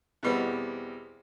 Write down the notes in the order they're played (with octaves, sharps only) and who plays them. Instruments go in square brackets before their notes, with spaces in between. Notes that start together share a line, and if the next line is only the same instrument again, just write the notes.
[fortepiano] E2 B2 G3 B3 C4